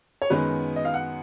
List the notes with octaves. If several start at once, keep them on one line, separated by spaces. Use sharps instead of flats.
C#5
F#2 D#3 G#3 B3 B4
D#5
F5
F#5